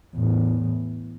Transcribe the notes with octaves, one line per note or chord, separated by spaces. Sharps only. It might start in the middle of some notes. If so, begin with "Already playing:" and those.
E2 A2